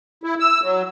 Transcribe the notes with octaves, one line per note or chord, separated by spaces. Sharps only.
E4
E6
F#3